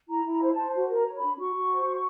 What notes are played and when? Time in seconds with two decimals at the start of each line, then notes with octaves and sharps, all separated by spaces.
0.09 E4 A#5
0.25 E4
0.31 A#5
0.42 C5
0.52 A5
0.57 C5
0.74 F#4
0.89 A#4
0.95 A#5
1.06 C#5
1.16 B5
1.22 D4
1.39 F#4 C#6
1.55 F#4
1.71 C5
1.87 F#4